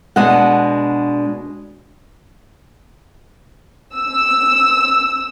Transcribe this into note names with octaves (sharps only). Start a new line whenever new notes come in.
B2 G#3 D4 F#5
E6